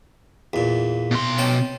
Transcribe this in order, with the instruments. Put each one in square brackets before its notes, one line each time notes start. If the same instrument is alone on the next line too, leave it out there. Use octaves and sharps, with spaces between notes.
[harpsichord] E2 A#2
[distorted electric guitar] B2 C6
[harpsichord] C#4 G5 A5